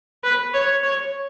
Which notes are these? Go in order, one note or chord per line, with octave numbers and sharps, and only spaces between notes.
B4
C#5
C#5